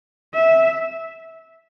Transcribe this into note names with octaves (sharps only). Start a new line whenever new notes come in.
E5